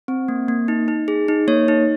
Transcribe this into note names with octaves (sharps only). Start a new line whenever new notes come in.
C4
A#3
A#3
D#4
D#4
G#4
D#4
A#3 C#5
D#4